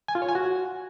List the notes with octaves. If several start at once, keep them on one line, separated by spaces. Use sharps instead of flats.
G#5
F4
C#5
G#5
F#4